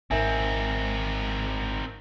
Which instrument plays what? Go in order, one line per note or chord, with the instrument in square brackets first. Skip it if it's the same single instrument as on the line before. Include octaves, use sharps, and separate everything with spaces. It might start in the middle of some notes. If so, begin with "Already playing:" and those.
[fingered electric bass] G#1 G#2 [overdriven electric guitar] C4 D#4 [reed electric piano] A#4 E5 G#5